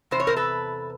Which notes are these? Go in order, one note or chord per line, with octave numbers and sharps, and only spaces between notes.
E2 C3 C5
C#5
A#4 C5
A4 B4